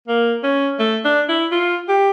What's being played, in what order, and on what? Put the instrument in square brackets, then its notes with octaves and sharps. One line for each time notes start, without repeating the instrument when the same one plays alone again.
[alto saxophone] A#3
C#4
A3
D4
E4
F4
G4